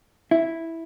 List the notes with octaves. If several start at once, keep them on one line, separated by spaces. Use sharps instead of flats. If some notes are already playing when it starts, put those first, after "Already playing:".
E4